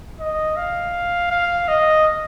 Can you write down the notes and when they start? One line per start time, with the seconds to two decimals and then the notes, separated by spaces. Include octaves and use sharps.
0.21 D#5
0.57 F5
1.31 F5
1.68 D#5